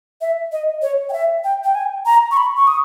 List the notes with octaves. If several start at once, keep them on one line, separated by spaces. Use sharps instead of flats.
E5
D#5
C#5
G5
E5
G5
G5
G#5
A#5
C#6
B5
C#6
D#6